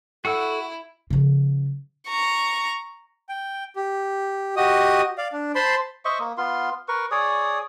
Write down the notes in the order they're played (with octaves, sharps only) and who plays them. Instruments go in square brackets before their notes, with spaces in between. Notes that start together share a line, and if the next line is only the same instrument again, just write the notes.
[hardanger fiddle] E4 [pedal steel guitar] F#4 F#5 E6 [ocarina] A4
[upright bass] C#3 F3
[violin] A#5 C#6
[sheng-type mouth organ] G5
G4
F#4 G4 D#5 D#6
D5 F5
D4
C5 A5 B5 C6
[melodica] C5 D#5 E5 C#6
A#3
B3 F4 C6
A#4 B4 C#6
G#4 C#5 D5 D#6